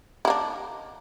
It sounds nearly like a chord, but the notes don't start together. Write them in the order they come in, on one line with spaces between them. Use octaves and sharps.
E4 A#3 D4